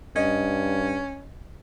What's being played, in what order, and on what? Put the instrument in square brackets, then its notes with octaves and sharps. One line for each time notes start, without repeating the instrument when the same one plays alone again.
[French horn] G2 [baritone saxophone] C#4 [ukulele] D#5